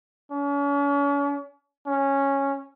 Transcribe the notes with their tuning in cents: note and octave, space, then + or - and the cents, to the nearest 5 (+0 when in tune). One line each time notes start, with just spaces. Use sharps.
C#4 +40
C#4 -10